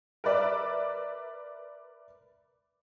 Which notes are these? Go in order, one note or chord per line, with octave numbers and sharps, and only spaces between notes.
A#4 B4 D5 E5